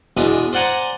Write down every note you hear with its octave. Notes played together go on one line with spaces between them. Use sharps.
E2 B2 G#3 D4
C5 D5 F#5 G#5 A#5